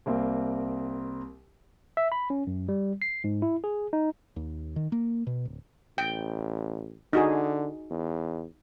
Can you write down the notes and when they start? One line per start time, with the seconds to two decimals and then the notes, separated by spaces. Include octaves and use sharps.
0.06 C2 A#3 C4
1.97 E5
2.12 B5
2.30 C#4
2.47 F#2
2.69 G3
3.02 C7
3.24 G#2
3.42 E4
3.64 G#4
3.93 D#4
4.36 D#2
4.76 D#3
4.92 A#3
5.27 B2
5.45 D1
5.98 A1 G5
7.13 D3 D#4 F#4 G#4
7.91 E2